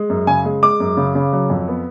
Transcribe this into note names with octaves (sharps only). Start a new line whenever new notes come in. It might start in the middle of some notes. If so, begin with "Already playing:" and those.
Already playing: G#3
F#2
C#3 G#5
G#3
G#3 D6
F#2
C#3
C#3
F#3
F2
B3